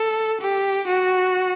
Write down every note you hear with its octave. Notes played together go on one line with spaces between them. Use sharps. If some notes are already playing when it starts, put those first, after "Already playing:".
Already playing: A4
G4
F#4